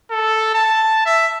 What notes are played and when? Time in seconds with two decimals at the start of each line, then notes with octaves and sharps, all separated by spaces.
0.11 A4
0.54 A5
1.06 E5